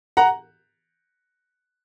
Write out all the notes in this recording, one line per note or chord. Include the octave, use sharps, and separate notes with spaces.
F#5 A#5